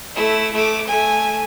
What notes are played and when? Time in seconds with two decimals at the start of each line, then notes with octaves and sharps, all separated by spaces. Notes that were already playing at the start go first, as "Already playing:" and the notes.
0.16 A3 E4
0.54 A3 D6
0.87 A3 G#5